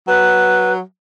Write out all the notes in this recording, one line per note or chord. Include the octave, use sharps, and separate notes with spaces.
F#3 B4